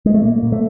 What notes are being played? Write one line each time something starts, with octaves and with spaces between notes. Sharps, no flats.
G#3
A3
A#2 A#3
A#2
A3